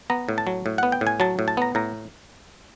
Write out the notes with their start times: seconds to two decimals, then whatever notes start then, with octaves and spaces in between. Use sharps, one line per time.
0.10 B3 A#5
0.29 A2
0.38 A5
0.47 F#3
0.66 A2
0.78 B3 F#5
0.92 G5
1.01 A2
1.07 G#5
1.20 F#3 A5
1.39 A2
1.48 A5
1.57 B3 A#5
1.75 A2 A#5